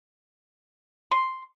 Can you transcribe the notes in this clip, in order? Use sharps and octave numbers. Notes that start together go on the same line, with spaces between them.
C6